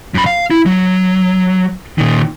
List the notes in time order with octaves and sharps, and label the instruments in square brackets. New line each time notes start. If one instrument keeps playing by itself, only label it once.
[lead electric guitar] F#2 B5
F5
E4
F#3
A#2 D#3